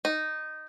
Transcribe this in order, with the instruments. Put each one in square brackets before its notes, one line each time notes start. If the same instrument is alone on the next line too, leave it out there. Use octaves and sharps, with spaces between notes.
[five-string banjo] D#4